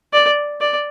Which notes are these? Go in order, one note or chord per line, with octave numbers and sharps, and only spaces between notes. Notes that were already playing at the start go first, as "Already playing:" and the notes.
D5
D5